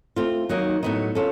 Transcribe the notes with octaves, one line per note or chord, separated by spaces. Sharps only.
A3 C4 F4
D#3 F#3 A#3 D#4
A2 F#3 B3 D#4
C#4 F4 A4